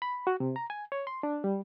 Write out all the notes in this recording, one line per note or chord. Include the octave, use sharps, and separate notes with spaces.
B5
F#4
C3
A#5
G#5
C#5
C6
D4
G3